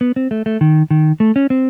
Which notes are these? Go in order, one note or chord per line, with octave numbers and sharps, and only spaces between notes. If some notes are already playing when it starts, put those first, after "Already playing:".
B3
C4
A3
A3
D#3
D#3
A3
C#4
C4